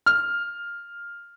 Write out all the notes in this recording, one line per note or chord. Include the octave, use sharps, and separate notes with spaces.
F6